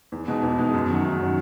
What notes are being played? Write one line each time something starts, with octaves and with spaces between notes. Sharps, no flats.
E2
B2 G#3 D#4
E2
B2 G#3 D#4
F#2
D#3 F#3
F#2
D#3 F#3